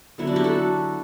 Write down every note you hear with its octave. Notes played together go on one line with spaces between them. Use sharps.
D3 F#3 B3 E4
D4 F#4
E4 G4
F#4 A4